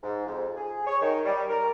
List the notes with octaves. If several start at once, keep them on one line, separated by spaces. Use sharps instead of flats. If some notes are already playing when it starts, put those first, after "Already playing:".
G#2
F2
G#4
C#5
D#3
G3
A#4